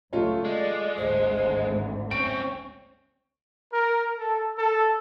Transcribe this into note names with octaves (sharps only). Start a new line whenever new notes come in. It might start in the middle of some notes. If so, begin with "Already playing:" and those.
C#2 A3 F4 C#5
G#3 D5
G#1 D2 C5
C4 C#4 C#6 D7
A#4
A4
A4